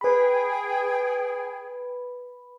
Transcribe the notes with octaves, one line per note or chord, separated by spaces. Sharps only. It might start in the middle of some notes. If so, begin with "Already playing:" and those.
G#4 B4 G5 B5